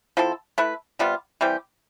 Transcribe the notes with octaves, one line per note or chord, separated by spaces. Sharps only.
F3 C4 E4 A4
A3 E4 B4
C3 G3 B3 F4
E3 G3 C4 G4